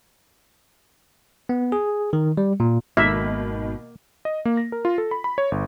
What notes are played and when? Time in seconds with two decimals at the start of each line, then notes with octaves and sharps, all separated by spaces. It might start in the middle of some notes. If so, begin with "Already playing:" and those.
1.49 B3
1.72 G#4
2.13 D#3
2.37 G3
2.60 A#2
2.97 G#1 B2 D#3 G#3 A#3 E5
4.25 D#5
4.45 A#3
4.57 A#6
4.72 A#4
4.85 F4
4.98 A4
5.11 B5
5.24 B5
5.38 C#5
5.52 G1